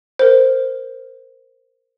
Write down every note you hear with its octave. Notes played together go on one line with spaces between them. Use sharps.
A#4 C5